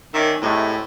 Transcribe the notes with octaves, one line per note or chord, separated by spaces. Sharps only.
D#3 C#4 D5 E5
A2 C3 G#3 A3